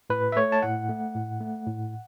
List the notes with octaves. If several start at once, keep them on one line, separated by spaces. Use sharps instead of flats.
A2 B4
E5
A3 C#5
A5
A2 F#5
A3
A2
A3
A2